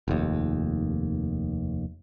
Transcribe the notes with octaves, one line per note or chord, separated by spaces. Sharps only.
F1 D#2